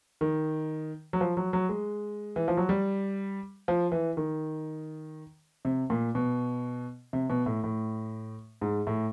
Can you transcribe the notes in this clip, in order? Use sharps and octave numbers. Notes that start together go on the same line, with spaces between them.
D#3
F#3
F3
F#3
F#3
G#3
E3
F3
F#3
G3
F3
E3
D#3
C3
A#2
B2
C3
B2
A2
A2
G#2
A2